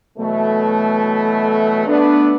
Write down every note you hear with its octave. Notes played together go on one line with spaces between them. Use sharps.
B2 E3 F#3 A3
A3 B3 D4